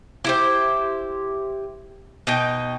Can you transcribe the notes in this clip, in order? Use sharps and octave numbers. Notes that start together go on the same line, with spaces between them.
E4 G4 C5
B2 D#4 G5